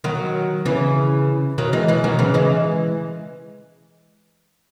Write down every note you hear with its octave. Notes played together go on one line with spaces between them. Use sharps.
D#3 F#3
C#3 E3
D#3 F#3
E3 G#3
E3 G#3
D#3 F#3
C#3 E3
E3 G#3